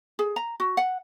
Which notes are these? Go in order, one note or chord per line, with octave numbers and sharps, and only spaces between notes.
G#4
A#5
F#4
F#5